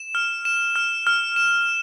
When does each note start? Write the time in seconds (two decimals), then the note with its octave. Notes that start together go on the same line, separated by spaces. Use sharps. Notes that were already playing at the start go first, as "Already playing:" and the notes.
Already playing: E7
0.15 F6
0.45 E7
0.76 F6
1.07 F6
1.36 E7